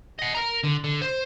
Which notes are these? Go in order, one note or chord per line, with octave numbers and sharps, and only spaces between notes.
D#5 F#5
A#4 A#5
D3
D3
C5